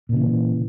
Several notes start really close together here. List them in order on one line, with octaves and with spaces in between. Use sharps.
A#2 C#3 E3